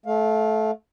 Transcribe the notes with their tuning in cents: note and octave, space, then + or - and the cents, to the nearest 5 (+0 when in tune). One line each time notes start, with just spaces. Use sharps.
A3 -20 F5 +15